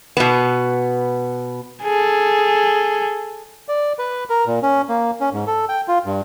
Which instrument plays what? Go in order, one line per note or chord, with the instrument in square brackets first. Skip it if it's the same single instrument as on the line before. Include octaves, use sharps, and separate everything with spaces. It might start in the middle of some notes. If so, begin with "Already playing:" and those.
[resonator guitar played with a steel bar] B2 B3
[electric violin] G#4 A4
[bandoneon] D5
B4
A#4
A#2
C#4
A#3
C#4
G#2
A4
G5
F4
G2